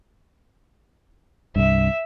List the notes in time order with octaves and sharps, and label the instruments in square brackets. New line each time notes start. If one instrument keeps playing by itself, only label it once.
[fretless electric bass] C2 G2 [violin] E5